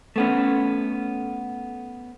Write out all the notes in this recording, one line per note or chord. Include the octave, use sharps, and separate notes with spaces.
A3 B3 C#4